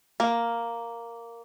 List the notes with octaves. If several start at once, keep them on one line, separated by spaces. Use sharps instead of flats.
A#3